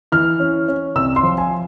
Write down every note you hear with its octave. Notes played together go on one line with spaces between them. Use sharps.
E3 F6
C#4
C#4
C2 E6
C6
F3
G#5